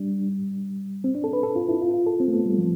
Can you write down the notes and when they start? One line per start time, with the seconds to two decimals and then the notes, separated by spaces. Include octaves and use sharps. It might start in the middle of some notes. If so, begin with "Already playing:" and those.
Already playing: G3 D4
1.04 C4
1.15 D4
1.24 A4
1.33 B4
1.43 A4
1.56 F4
1.69 E4
1.81 F4
1.94 F4
2.06 A4
2.20 C4
2.28 A3
2.33 B3
2.46 G3
2.58 F3